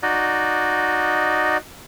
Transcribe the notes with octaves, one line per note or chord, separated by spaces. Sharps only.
D#4 F#4 D5 D#5